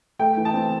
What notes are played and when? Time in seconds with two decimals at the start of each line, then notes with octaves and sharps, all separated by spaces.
0.19 A3 G5
0.37 E3
0.45 A5
0.54 C4